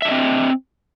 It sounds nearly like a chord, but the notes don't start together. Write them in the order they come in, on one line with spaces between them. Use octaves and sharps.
E5 D4 D#5 C4